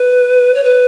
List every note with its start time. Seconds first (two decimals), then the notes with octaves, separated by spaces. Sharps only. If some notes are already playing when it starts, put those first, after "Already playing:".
Already playing: B4
0.54 C#5
0.64 B4